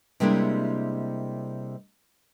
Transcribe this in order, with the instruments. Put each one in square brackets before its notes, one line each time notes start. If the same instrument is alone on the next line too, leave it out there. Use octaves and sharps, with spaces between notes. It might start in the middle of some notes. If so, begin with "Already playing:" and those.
[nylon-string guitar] C3 G3 G#3 A#3 D4 E4